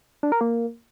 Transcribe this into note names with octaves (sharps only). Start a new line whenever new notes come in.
D4
A#4
A#3